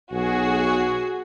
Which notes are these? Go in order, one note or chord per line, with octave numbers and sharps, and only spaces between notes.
B1 F#4 G#4